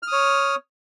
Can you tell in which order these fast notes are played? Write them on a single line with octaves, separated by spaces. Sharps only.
F6 D#6 C#5